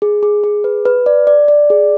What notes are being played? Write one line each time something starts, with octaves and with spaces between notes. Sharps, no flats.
G#4
G#4
G#4
B4
B4
D5
D5
D5
G#4